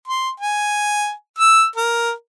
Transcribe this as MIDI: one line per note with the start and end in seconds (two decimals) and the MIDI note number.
0.08 0.30 84
0.40 1.11 80
1.39 1.65 88
1.76 2.11 70